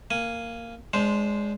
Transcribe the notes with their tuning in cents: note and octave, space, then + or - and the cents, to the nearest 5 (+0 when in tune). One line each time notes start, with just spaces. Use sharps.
A#3 -10 G#5 +0
G#3 +0 D4 -30 C5 -5